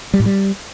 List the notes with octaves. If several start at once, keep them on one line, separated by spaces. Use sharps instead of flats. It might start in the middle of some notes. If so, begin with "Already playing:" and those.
G3
A2
G3